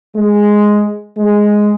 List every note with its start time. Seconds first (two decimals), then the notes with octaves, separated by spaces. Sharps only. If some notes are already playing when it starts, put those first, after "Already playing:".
0.16 G#3
1.17 G#3